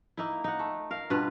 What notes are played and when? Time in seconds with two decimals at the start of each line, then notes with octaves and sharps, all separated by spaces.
0.17 A#3 D#4 E4
0.44 D#4 F#5
0.59 A3
0.91 A#4 F5
1.10 G2 B2 F4 B4